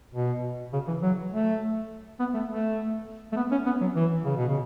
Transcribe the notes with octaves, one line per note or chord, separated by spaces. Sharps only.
B2
C#3
E3
F#3
A3
B3
A3
A3
A3
B3
C#4
B3
F#3
E3
C#3
B2
C#3